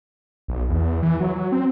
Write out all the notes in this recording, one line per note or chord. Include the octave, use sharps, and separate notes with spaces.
B1
E2
E3
F#3
F#3
C4